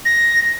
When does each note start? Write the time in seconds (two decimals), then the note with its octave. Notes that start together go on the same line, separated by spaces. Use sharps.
0.05 A#6